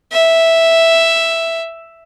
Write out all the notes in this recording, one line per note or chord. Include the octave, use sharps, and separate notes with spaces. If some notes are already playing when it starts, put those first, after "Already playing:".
E5